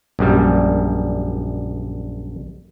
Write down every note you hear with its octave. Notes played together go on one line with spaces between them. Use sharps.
A#1 F#2 G3